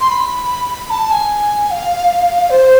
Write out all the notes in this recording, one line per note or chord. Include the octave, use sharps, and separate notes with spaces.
C6
B5
A5
G#5
F5
C5